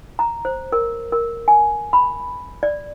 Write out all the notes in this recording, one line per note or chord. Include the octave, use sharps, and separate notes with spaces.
A#5
C5
A#4
A#4
G#5
B5
D5